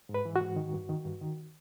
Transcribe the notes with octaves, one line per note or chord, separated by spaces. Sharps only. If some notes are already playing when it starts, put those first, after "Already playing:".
G#2
B4
E3
F#4
G#2
D#3
G2
D#3
G2
D#3